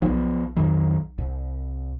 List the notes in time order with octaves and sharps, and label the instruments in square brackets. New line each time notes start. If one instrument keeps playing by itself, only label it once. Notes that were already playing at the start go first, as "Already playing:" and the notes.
[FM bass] B1 [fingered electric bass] F3 B3
[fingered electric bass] F2 D#3 F#3
C2